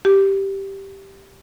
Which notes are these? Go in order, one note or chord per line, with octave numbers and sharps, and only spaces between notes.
G4